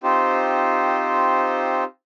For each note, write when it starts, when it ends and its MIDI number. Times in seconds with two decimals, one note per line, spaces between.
0.03 1.84 60
0.03 1.84 63
0.03 1.84 65
0.03 1.84 67
0.03 1.84 72